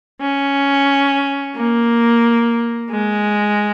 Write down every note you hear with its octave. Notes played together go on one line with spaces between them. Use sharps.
C#4
A#3
G#3